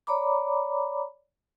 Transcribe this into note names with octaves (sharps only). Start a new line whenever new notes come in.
C#5 D5 A#5 B5 D6